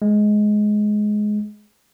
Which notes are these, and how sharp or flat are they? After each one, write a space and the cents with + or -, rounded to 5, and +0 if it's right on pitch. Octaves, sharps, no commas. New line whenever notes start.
G#3 +15